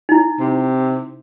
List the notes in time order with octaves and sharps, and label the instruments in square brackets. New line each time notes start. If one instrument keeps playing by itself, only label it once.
[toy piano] D#4 E4
[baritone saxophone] C3